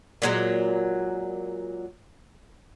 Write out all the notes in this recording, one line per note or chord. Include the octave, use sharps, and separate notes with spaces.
A#2 F#3 G#3